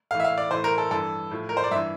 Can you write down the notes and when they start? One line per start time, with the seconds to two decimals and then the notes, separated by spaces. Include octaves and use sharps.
0.11 A2 E3 F5
0.20 E5
0.24 F5
0.38 D5
0.51 A2 E3 C5
0.64 A#4
0.78 A4
0.91 G2 E3 A4
1.31 A2 F3
1.49 A#4
1.57 C5
1.64 D5
1.71 G2 E3 E5